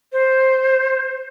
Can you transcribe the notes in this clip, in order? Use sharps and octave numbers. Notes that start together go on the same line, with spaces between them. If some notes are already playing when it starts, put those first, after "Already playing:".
C5